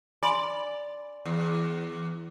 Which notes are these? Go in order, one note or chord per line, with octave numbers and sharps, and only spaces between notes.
D5 G#5 B5 C6
E2